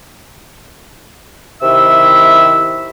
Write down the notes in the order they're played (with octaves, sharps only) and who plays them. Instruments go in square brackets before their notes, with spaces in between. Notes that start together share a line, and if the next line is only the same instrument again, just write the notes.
[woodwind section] C3 D#3 E4 E5 E6